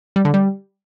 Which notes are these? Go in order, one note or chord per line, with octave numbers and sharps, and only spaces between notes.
G3
D3
G3